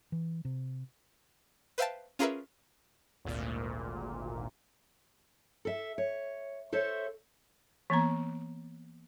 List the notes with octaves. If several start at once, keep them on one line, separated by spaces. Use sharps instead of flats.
E3
C3
B4 C5 E5 F5 G5 A5
C#4 F4 G#4 A#4 B4 E5
G#1 D2 A#2
A4 E5
C#5
A4 C5 C#5 E5
E3 A#3 B3 A#5